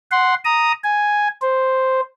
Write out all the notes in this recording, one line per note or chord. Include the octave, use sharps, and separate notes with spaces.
F#5 C6
A#5 D#6
G#5
C5